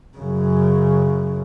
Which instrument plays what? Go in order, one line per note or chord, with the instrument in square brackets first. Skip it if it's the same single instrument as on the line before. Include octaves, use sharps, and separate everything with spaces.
[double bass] F#2 C#3